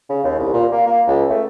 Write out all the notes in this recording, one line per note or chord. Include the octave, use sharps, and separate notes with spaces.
C#3
D#2
C2
A#2
A#3
A#3
C#2
A3